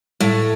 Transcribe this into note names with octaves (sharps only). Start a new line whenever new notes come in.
A2 A3